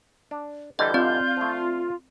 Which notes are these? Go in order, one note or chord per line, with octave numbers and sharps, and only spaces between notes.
D4
D3 E3 G3 A4 D#5 G6
C4 F4 D5
F3 A3